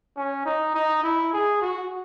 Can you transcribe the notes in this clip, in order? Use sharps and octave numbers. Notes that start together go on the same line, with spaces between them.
C#4
D#4
D#4
E4
G#4
F#4